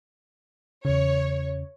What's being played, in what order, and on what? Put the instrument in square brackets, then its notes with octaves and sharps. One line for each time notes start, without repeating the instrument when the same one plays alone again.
[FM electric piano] E2 C#3 [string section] C#5